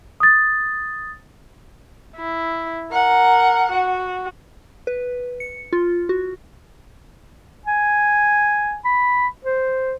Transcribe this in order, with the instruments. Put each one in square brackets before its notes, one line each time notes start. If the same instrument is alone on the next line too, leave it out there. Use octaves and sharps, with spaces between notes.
[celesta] D#6 A6
[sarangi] E4
[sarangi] A#4 [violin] F#5
[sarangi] F#4
[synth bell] B4
C#7
F4
F#4
[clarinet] G#5
B5
C5